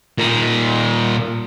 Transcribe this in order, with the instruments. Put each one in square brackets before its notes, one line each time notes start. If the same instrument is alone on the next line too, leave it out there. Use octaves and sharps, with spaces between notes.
[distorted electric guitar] A#2 D#4